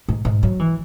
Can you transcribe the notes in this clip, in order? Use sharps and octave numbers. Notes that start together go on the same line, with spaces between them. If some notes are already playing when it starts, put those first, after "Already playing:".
G#2
G#2
F#3
E3